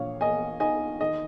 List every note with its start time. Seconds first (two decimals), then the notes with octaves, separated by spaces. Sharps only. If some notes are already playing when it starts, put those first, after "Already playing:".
Already playing: A#1 C#5 F5
0.21 A#3 D#5 G#5
0.60 D#4 D#5 G#5
1.00 D#3 D#5